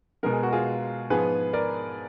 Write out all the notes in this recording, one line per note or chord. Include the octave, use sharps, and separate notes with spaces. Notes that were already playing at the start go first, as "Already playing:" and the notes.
B2 G#3 B3 A#4
G#4
F#4
F4 G#4
G#2 F3 B3 G#4 B4
A#4 D5